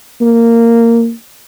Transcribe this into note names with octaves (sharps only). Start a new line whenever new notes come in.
A#3